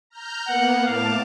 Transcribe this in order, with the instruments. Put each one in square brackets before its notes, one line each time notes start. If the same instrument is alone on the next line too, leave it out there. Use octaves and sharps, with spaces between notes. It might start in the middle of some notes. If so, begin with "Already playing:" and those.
[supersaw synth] A#5 F6 G6
[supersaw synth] A#3 B3 [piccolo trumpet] F#5
[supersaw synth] A2 A5 D6 [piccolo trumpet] F5